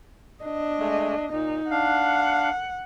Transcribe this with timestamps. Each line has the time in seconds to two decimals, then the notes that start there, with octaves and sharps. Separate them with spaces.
0.44 D4 D#5
0.79 G#3 A3
1.32 A#2 D#4
1.71 D4 F5 F#5